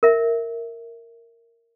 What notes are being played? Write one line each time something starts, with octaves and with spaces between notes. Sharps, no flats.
A#4 E5